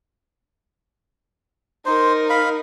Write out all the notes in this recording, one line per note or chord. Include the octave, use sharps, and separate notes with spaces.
D#4 A#4 C5
F5 B5